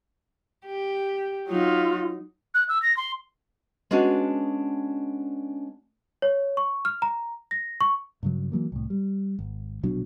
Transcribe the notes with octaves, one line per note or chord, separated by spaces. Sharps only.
G4
F#3 D#4 F4
F#6
E6
A#6
C6
G#3 B3 C#4 D4 F#4
C#5
C#6
F6
A#5
A#6
C#6
G2 C#3 F#3
E3 F#3 A#3
C2 A2
G3
G#1
A#1 B2 F#3 D4